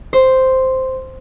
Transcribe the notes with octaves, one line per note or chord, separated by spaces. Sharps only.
C5